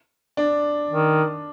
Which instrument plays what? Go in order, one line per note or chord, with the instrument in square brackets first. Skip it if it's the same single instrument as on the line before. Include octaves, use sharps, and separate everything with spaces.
[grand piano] D4
[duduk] D#3